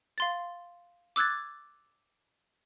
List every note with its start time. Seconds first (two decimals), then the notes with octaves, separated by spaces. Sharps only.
0.18 F5 C6 A6
1.16 D6 E6 F#6 G#6 A6